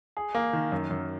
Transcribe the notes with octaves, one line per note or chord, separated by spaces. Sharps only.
G#4
A#3
D#3
F#2
F#2